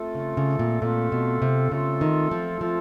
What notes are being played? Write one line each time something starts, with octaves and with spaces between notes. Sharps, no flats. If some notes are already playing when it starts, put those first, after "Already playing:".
Already playing: A3 C4 F4 A4
C#3
C#3
A#2
A#2 A3 C4 F4 A4
B2
C3
C#3 A3 C4 F4 A4
D#3
F3
F3 A3 C4 F4 A4